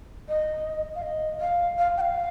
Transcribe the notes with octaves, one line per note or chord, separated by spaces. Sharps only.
D#5
F5
D#5
F5
F5
G5
F5